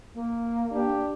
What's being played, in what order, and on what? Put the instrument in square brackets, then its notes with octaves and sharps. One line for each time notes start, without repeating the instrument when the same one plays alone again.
[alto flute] A#3
[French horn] D4 [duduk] G4